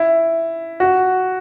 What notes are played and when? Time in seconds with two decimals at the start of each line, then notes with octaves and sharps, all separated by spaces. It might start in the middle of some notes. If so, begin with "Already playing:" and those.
Already playing: E4
0.80 F#4